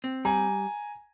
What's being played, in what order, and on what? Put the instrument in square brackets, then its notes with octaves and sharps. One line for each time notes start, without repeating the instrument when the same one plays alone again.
[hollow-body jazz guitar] C4
[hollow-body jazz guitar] G3 [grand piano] G#5 A#5